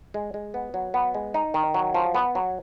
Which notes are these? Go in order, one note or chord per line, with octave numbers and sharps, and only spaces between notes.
G#3
G#3
B3
F#3
B3
G#3
D#4
D#3
F#3
F3
B3
F#3